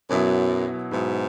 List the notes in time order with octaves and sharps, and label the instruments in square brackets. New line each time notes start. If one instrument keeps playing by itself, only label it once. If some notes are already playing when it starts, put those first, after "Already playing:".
[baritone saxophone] F#2 [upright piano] B2 F#3 B3 E4
[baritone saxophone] G#2 [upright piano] B2 F#3 B3 E4